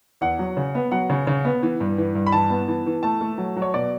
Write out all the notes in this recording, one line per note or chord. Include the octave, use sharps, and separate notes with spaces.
E2 F#5
F#3
C#3
B3
F#3 F#5
C#3
C#3
B3
E3
G2
E3
G2
B5
E3 A5
B3
E3
E3
A3 A5
A3
F#3
F#3
C#5
B2 D5